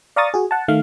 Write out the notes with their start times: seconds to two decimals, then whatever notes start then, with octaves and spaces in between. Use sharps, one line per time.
0.16 D5 F5 A#5 C#6 D#6 A6
0.34 F#4 G#4
0.51 F#5 A5
0.68 D#3 A3 F5 F6